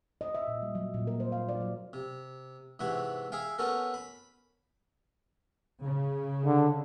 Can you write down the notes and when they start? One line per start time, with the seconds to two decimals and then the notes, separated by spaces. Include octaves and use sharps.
0.21 D#5
0.35 E5
0.48 A#2
0.62 G3
0.75 F#3
0.94 A#2
1.07 A#4
1.20 C5
1.32 F5
1.49 D5
1.60 F#3
1.93 C3
2.79 G#2 C3 E3 E4 F#4
3.32 G#4 E5 F5 G5
3.58 B3 C#4 F#4 A4 A#4
3.94 B5
5.82 C#3
6.45 D3